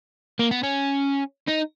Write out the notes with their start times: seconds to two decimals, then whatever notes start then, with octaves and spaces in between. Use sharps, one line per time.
0.39 A#3
0.51 B3
0.63 C#4
1.48 D#4